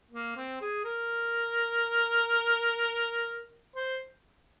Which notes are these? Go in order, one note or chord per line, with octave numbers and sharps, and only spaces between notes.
A#3
C4
G#4
A#4
C5